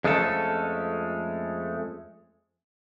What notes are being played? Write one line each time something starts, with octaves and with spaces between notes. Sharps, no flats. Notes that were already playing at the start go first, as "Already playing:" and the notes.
F2 G#3 A3 C#4 A4